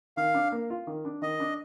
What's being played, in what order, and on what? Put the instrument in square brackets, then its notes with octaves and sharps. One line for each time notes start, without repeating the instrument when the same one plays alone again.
[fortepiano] D#3 [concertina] F5
[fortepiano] D4
A#3
F4
D#3
D4
[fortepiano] D#3 [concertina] D#5
[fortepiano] D4